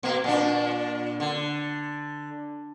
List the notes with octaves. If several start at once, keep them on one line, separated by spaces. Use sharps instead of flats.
B2 A#3
A#2 D4
D3